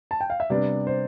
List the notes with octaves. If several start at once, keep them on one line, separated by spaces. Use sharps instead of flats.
A5
G5
F5
E5
C3 G3 B3 D4 D5
C5